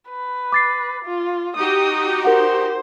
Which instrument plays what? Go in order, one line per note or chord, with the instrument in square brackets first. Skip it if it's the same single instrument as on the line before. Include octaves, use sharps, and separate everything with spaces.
[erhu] B4
[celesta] D6 A6 C7
[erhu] F4
[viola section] D#4 F#4 G4 [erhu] D#6
[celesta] A#4 F#5 [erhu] C5